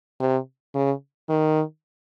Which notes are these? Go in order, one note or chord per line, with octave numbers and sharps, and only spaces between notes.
C3
C#3
D#3